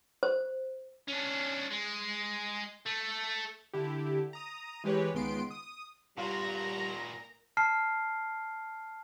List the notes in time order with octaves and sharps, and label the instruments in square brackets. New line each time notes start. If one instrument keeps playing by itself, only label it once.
[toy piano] C5
[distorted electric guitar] C#4 D4
G#3
A3
[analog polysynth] D3 E4 G4
A#5 D#6
E3 G#3 G4 B4 C#5
C#2 D#3 G#3 B3 C6 D7
D#6
[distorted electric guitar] A#2 F#4 [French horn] G3 [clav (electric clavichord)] F4 [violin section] A#4 A#5
[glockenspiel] A5 F6 C7